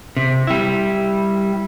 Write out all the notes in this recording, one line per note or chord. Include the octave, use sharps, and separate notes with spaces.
C3
G3 E4